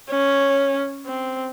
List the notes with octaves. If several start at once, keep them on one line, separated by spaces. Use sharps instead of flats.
C#4
C4